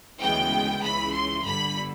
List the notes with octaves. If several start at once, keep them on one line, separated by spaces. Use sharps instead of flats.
D2 C#3 E3 G#3 B3 G5
C#2 C#3 E3 B5
C6
G1 G2 D3 B5